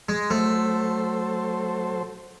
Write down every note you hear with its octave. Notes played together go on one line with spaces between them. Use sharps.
G#3
F#3 A3 A4 C5